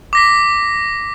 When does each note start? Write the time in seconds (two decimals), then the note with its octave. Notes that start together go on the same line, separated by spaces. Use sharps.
0.13 D6 A#6 B6